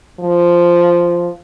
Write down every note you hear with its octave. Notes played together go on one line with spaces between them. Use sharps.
F3